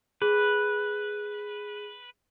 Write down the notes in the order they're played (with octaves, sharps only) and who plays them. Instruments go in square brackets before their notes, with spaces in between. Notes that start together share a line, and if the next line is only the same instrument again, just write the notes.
[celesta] G#4 [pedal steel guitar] B4